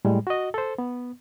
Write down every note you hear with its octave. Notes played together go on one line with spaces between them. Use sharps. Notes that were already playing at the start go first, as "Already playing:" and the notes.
A2 G3 G#3
F#4 D#5
A4 C5
B3